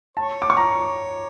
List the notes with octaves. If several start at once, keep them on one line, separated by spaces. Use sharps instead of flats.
C#5 A5
D6
C#6
A#5